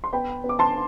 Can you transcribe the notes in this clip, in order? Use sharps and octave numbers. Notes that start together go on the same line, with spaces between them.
C6
B3 G5 B5
B3
D6
A5 C6